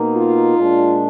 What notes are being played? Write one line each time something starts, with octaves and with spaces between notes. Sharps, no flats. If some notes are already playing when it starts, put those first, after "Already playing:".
Already playing: B2 A#3 D#4
F4
A#2 G#3 D4